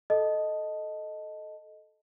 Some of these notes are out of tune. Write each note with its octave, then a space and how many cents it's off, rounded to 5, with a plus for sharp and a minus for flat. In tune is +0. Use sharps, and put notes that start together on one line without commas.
A4 -10 D#5 +0 A5 +0